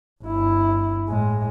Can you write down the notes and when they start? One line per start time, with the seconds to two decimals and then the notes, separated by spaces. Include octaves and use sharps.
0.23 G1 E4
1.09 A2 G#3